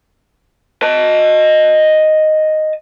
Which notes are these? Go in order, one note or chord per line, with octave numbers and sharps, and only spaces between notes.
D#5 A5